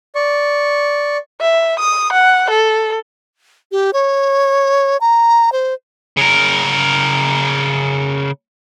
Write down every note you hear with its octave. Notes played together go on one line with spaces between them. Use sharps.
D5 C#6
E5
D#6
F#5
A4
G4
C#5
A#5
C5
C#3 A#4